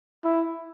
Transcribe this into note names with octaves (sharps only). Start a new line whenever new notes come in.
E4